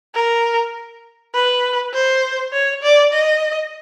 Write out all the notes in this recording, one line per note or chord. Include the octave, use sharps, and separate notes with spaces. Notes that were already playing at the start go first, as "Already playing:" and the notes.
A#4
B4
C5
C#5
D5
D#5